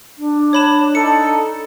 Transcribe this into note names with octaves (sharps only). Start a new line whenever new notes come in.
D4
C#5 B5 E7
D#4 A4 C#7